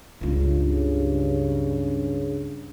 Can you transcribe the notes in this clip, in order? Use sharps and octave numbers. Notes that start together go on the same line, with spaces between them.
C#2 G2 C#3 F4